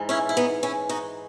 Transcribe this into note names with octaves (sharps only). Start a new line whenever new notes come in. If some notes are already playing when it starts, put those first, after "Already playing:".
Already playing: G#2 E3
C#4 E4
E4
B3 D#4
C#4 E4
D#4 F#4